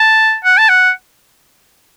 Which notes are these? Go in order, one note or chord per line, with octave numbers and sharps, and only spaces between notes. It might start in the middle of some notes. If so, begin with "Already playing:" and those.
Already playing: A5
F#5
A5
F#5